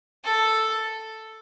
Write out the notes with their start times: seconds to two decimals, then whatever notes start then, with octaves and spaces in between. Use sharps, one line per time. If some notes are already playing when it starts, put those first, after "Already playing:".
0.24 A4